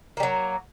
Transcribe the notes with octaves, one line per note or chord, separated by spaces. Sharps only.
F#3 G3 A#3